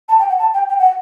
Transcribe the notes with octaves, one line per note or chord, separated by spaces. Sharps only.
A5
G5
F#5
A5
G5
G5
F#5